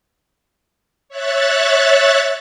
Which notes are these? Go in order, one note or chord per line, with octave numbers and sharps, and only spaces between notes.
C#5 E5 F#6 A6